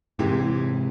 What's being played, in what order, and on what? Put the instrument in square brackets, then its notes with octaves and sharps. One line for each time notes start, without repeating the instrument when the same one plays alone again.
[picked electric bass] G#2 C3 [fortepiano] E3 G#3 G4